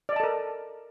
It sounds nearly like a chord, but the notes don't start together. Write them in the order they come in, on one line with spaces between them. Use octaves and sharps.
D5 D#5 A5 A4 A#4